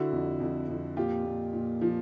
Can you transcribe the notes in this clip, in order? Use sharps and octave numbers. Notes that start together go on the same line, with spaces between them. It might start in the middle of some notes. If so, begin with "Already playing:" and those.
Already playing: D3 E4 F#4
F2
F2
F2
A#2 F4 G4
A#2
A#2
F3